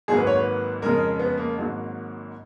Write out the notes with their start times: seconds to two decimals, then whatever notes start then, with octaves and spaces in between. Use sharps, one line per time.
0.08 G#1 G#2 F#3 A#3 G#4
0.17 B4
0.27 C#5
0.36 B4
0.82 F2 C#3 G#3 A#4
1.19 B3
1.38 A#3
1.57 G#1 G#2 F#3 A#3